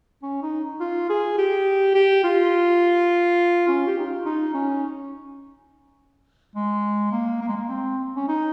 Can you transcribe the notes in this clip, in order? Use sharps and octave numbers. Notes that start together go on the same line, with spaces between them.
C#4
D#4
F4
G#4
G4
G4
F4
C#4
G4
D#4
F4
D#4
C#4
G#3
A#3
A#3
G#3
A#3
C4
C#4
D#4